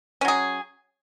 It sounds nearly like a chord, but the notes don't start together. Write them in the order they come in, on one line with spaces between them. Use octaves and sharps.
C#4 F#3 G#4